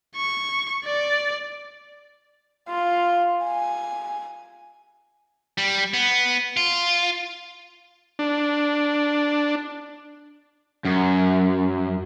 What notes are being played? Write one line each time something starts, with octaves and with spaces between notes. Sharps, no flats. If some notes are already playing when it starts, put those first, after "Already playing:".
C#6
D5
F4
G#5
G3
B3
F4
D4
F#2